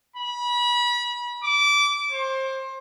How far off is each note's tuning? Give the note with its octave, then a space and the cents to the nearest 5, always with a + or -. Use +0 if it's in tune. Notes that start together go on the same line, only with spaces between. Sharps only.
B5 -30
D6 -20
C5 +25